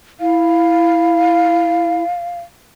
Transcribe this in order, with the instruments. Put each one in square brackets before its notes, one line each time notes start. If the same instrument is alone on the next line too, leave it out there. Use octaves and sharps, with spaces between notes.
[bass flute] E4 [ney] F5